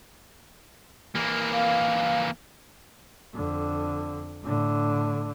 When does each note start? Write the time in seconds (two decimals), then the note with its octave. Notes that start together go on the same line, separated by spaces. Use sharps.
1.15 E3 A#3
1.53 F5
3.34 F2 D3
4.43 A2 D3